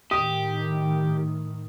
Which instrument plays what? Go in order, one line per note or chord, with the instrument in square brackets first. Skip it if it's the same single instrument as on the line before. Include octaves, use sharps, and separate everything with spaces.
[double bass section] A2 D#3 [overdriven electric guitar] G4 [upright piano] D#6